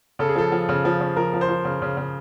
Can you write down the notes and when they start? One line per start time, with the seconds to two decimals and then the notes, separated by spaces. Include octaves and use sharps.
0.19 C#3 A4
0.29 G#4
0.35 F3 A4
0.52 F3
0.69 C#3
0.85 F3
1.01 C#3
1.16 F3 A#4
1.34 F3
1.41 C5
1.49 F3
1.65 C#3
1.82 C#3
1.97 C#3